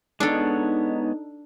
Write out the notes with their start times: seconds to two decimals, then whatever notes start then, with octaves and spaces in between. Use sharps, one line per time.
0.20 G#3 B3 D4 D#4 A4 C#5